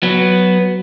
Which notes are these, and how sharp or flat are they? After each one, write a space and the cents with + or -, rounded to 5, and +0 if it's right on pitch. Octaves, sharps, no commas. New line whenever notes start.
F#3 +0 B3 +0